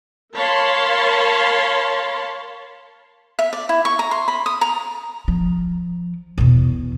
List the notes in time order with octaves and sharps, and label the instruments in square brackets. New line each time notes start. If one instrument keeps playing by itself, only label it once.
[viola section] A#4 C#5 F5 A5 B5 C6
[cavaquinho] E5
D5
E4
C#6
A#5
C6
B5
D#6
A#5
[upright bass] F3
E2 B2